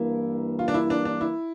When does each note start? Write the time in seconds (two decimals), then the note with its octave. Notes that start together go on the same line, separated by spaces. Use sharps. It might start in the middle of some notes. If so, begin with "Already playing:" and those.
Already playing: G2 E3 A#3 E4
0.59 F4
0.68 D4
0.74 E4
0.90 D4
1.05 D4
1.21 E4